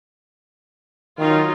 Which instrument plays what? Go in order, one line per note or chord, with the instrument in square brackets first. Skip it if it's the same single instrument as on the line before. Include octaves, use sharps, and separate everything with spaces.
[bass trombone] D#3 [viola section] F#3 D#4 F4